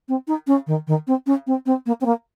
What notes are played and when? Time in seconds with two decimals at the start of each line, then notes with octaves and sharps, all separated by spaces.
0.08 C4
0.27 D#4
0.47 C#4
0.67 D#3
0.87 D#3
1.07 C4
1.26 C#4
1.47 C4
1.66 C4
1.86 A#3
2.01 C4
2.05 A#3